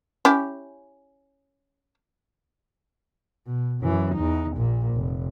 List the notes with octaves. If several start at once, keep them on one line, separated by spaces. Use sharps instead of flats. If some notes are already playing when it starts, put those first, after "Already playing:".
C#4 E4 G4
B2
F#2 E3
E2 D#4
A#1 A#2
F1